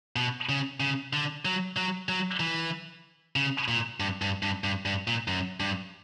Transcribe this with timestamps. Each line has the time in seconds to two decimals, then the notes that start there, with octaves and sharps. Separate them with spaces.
0.16 B2
0.49 C#3
0.80 C#3
1.13 D3
1.45 F#3
1.77 F#3
2.09 F#3
2.40 E3
3.36 C#3
3.68 A#2
4.00 G2
4.22 G2
4.43 G2
4.64 G2
4.85 G2
5.08 A#2
5.28 F#2
5.60 G2